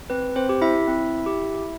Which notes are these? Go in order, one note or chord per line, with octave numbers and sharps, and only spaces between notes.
C4 B4
C4 C5
G4
E4 E5
C4
G4